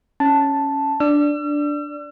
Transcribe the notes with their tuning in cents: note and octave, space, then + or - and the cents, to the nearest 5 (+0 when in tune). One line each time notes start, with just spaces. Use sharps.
C#4 +0 A5 +0
D4 +0 D5 +0 E6 +40